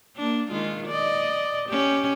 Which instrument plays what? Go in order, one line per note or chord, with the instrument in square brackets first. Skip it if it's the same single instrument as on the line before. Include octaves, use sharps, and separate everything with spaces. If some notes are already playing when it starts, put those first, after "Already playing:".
[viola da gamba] A#3 D4
D#3 G#3 F4
D5 D#5
C#4 G4